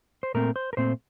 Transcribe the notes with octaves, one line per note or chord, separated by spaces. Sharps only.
C5
A#2 A3 C4 A#4
C5
A#4
A#2 A3 C4 C5